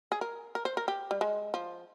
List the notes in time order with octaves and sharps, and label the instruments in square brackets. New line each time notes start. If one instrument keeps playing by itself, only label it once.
[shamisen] G#4
A#4
A#4
C5
A#4
G4
G3
G#3
F3